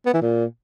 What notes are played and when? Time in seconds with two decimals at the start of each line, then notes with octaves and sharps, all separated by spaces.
0.06 B3
0.14 E3
0.22 A#2